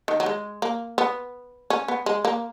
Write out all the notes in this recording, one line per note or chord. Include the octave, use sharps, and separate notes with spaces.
D#3
F#3
G#3
A#3
B3
C#4
B3
G#3
A#3